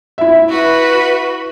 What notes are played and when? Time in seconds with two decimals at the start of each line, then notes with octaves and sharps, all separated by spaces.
0.18 E4 E5
0.49 F#4 B4